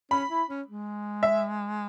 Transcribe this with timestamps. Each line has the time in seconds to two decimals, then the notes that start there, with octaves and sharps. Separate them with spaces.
0.11 C#4 B5
0.30 E4
0.49 C#4
0.68 G#3
1.23 E5